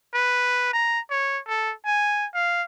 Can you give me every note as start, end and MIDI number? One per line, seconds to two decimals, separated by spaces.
0.14 0.69 71
0.73 1.00 82
1.10 1.39 73
1.47 1.72 69
1.86 2.26 80
2.34 2.63 77